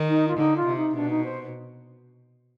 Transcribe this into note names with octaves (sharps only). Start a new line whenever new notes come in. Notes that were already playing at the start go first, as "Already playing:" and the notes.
Already playing: D#3
D#4
F4
D3 D#4
F4
C3
D#4
B2 D4
D#4
C5